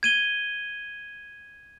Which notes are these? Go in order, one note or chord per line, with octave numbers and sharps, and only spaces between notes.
G#6 D#7 G7